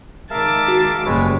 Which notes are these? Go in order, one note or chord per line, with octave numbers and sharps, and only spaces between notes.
D#3 G#3 A#4 E5 F5 A5 D6
F#4
F#1 A2 G3 G#3 B4 C#5